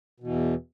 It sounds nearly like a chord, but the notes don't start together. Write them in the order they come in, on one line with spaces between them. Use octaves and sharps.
B2 E3 E2